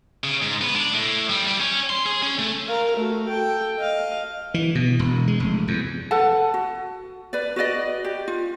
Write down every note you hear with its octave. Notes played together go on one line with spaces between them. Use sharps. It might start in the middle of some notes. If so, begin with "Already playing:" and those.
C#3
G#2
B3
D4
A2
G3
G3
C#4
C6
G#4
C#4
A3
A#4 F5
A3 F#4
A4 G5
D#5 F5
E3
B2
E1
G#3
F1
E2
A4 B4 F#5 A5
F#4
B4 D5
F#4 B4 D5 D#5
G4
F4